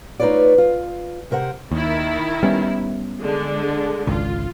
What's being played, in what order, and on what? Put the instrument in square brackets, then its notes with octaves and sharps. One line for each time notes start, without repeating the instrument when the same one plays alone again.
[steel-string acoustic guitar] A3 D#4 F4 B4 C#5 D5
F4
C3 A#4 C5 F#5
[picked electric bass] D#2 [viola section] D#3 E4
[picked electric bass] G3 B3 C#4
[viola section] D3 G#3
[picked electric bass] G#1 C#2 [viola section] F4